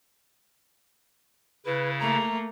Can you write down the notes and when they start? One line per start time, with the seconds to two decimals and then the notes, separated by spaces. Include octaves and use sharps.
1.66 C#3 E4 B4
2.00 A3 A#3 A#5